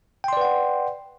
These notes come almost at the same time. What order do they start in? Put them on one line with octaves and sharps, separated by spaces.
G5 C6 D5 B4 F#5